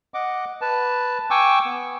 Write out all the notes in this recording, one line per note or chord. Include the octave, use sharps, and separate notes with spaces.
D#5 F#5 D6
B4 A5
G5 G#5 C#6 D6 E6
B3